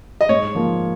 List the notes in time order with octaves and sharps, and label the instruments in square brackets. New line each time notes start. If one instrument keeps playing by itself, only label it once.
[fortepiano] D#5
[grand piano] G#2 [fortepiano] C#5
[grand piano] F3 A#3 F4